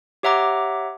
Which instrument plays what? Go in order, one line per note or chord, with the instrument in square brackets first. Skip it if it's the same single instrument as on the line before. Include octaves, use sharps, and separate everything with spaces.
[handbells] G4 C#5 E5 F#5 A#5 D6